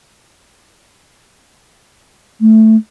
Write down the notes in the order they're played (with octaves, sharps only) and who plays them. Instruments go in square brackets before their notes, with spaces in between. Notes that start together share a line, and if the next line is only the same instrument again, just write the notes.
[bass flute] A3